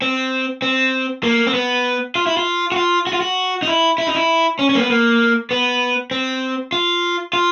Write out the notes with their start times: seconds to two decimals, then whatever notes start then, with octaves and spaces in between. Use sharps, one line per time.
0.02 C4
0.62 C4
1.23 A#3
1.47 C4
1.54 B3
2.15 F4
2.27 E4
2.37 F4
2.72 F#4
2.76 F4
3.07 F#4
3.13 F4
3.21 F#4
3.62 D#4
3.68 E4
3.98 E4
4.07 D#4
4.15 E4
4.59 C#4
4.69 C#4
4.74 A#3
4.80 B3
4.90 A#3
5.51 B3
6.11 C4
6.73 F4
7.33 F4